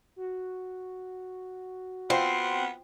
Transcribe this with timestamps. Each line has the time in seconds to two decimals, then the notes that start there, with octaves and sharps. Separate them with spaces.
0.16 F#4
2.10 B3 C4 F4 C5 C6